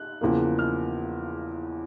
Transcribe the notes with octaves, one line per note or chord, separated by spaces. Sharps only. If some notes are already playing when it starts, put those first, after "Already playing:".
Already playing: F#6
E2 C#3 F3 A#3
F6